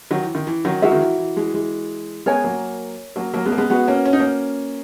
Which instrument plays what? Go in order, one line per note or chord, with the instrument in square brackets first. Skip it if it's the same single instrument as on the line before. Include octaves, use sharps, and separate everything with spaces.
[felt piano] D#3 F#3
E3
D#3
E3
D#3 F#3
[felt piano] E3 G#3 [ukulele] F#4 A#4 E5
[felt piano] D#3
E3
E3
E3 G#3
E3 G#3
[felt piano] G#3 B3 [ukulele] A#4 C#5 G#5
[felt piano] F#3 A#3
F#3 A#3
F#3 A#3
G#3 B3
A#3
G#3 B3
[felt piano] G#3 B3 [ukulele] F#4 B4 F#5
[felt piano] A#3 C#4
C#4
D#4
A#3 C#4